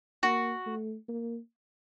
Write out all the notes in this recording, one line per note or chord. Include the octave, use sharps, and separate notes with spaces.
A#3 F#4
A3
A#3